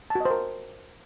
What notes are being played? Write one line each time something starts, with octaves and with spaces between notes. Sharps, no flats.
A5
F#4
D#5
C5
A#4